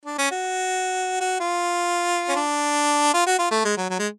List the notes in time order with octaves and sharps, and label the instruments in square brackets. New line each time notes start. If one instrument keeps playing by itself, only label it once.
[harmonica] D4
C#4
F#4
F#4
F4
C#4
D4
F4
F#4
F4
A3
G#3
F#3
F#3
G#3